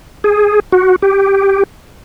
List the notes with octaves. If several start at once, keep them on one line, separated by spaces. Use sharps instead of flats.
G#4
F#4
G4